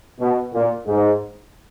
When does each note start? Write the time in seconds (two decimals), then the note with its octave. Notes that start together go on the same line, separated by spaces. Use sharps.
0.20 B2
0.54 A#2
0.86 G#2